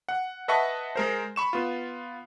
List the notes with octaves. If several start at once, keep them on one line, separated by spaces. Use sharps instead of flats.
F#5
B4 D#5 E5 F#5 A5 C#6
G#3 A#4 C5
B5 C#6 E7
B3 F4